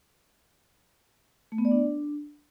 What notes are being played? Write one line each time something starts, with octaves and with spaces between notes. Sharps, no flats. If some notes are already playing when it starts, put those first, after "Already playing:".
A3
B3
D5
D4